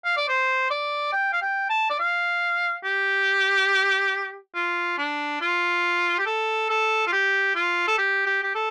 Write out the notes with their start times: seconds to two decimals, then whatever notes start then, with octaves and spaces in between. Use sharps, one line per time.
0.05 F5
0.17 D5
0.28 C5
0.70 D5
1.13 G5
1.33 F5
1.42 G5
1.70 A5
1.90 D5
2.00 F5
2.84 G4
4.55 F4
4.98 D4
5.41 F4
6.19 G4
6.27 A4
6.70 A4
7.07 F4
7.13 G4
7.56 F4
7.88 A4
7.98 G4
8.26 G4
8.44 G4
8.55 A4